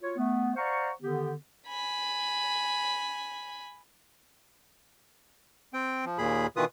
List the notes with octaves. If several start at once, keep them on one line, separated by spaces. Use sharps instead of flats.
F4 F#4 C#5
A3 B3
C5 D5 F5 F#5 A#5 C#6
D3 D#3 B3 G4
G#5 B5
C4 G5
F3
D#2 A#2 G#4 B5
B2 D#3 E3 F4 B4 D#6